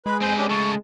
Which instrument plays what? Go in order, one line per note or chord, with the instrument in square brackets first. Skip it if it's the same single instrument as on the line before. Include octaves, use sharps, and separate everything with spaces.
[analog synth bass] G#3 [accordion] B4 B5
[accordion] F2 C5 [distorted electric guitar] C4 B4 [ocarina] G#5
[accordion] C#4 D4 G4
[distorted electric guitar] C#3 A3 [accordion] A5 [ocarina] C#6